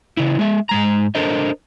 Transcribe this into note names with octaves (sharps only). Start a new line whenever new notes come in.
C#3 E3 E4
G#3 E5
G#2 G#3 A#5
D4 A4 A#4 C5 D#5